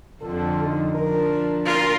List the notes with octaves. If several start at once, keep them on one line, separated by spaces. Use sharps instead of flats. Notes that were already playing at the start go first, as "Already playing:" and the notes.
F2 D3 F3 A4
D#4
F3 D4 A#4
A#2 F4 A#4